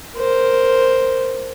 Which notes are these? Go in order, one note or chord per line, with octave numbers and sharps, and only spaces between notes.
A#4 C5